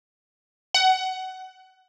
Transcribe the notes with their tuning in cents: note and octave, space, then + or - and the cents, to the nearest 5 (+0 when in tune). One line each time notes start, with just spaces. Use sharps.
F#5 +20